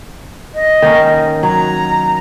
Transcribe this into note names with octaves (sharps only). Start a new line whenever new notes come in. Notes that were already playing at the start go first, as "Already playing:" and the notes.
D#5
D#3 A#3 C#4
F#3 A#5